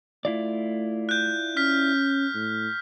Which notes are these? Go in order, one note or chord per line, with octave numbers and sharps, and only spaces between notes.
A3 E4 F4 D5
F#6 G6
C#4 F6 B6
A2